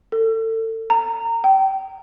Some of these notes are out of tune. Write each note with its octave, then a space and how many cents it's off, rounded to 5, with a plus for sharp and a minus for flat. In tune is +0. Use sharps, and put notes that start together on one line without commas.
A4 +30
A#5 -20
G5 -25